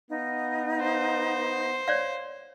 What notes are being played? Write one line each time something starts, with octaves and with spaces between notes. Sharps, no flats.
B3 D#4 F5
C5
C#5 D5 F5